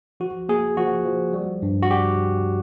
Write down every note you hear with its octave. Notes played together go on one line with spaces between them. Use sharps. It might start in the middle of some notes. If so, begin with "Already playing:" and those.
F3 F#4
A#3 G#4
F3 F#4
F3
G3
G2
F#4
G3 G4